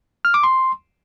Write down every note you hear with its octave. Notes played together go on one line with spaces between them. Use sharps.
F6
D6
C6